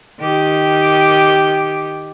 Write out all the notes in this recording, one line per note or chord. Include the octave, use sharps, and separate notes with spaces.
D#3 G4